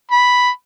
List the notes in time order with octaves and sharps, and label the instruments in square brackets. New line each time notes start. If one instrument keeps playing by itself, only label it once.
[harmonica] B5